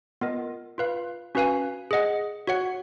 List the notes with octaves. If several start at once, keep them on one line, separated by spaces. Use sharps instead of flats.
B3 F4 A#4 D#5
F4 B4 F5
C#4 F#4 B4 F5 G#5
G#4 D#5 F#5
F#4 C#5 F#5